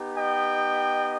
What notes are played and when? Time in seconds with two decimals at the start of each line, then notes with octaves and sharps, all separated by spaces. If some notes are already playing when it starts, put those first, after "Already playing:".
Already playing: B3 D#4 G4
0.17 D#5 G5